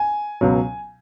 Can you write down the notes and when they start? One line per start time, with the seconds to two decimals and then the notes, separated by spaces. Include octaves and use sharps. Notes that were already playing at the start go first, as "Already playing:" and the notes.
Already playing: G#5
0.41 C#2 B2 F#3